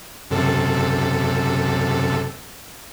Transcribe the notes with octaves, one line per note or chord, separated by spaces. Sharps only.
F#2 C3 A4